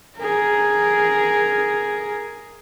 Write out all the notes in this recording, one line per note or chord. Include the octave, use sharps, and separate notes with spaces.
G#4 A#4